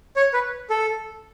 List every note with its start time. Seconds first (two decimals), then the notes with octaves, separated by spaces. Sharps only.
0.17 C#5
0.34 B4
0.70 A4